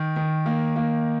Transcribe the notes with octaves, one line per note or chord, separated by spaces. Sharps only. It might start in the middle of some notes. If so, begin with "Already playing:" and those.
Already playing: D#3
D#3
A#3
A#3